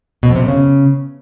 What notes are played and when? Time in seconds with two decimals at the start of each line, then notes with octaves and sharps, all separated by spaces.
0.23 B2
0.29 F2
0.36 C3
0.42 F#2
0.48 C#3